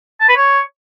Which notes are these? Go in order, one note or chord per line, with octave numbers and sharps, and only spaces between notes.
A5
B4
C#5